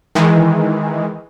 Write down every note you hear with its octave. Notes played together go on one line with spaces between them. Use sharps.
D#3 E3 G#3